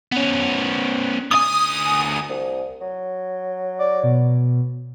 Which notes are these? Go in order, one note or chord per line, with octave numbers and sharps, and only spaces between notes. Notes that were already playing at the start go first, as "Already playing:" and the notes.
B3 C#4
D2 G#5 D#6
C2
F#3
D5
B2